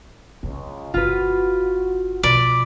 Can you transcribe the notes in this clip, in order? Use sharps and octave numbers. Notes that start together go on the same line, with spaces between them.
C#2 C#3 F#3
G1 C#3 F4 F#4 B4
B2 F3 D5 B5